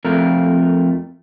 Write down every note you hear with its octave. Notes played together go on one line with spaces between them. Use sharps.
F2 A3 A#4